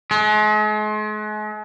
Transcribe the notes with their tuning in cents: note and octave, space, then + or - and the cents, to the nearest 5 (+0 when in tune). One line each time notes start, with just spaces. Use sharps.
G#3 +40